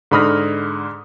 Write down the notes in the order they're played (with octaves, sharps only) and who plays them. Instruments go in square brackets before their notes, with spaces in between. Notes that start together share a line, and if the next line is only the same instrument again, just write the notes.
[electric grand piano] G#2 D3 B5 D#6 F6 A#6